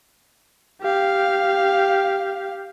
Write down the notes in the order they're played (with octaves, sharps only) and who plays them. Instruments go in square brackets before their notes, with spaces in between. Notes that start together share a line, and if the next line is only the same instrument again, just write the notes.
[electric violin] G4 F5